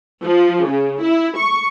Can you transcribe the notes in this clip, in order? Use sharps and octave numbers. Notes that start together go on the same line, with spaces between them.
F3
C#3
E4
C#6